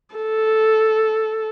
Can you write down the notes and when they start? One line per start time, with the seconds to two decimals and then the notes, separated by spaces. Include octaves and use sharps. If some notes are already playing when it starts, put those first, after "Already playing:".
0.15 A4